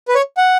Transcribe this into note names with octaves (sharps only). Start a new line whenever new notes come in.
B4
C#5
F#5